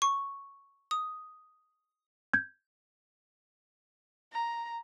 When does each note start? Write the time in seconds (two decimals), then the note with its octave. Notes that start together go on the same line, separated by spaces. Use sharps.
0.02 C#6
0.91 D#6
2.33 G6 G#6
4.32 A#5